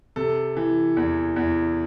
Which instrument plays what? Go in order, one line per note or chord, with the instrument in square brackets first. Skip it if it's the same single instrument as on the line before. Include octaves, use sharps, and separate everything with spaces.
[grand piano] C3 A4
E3
E2
E2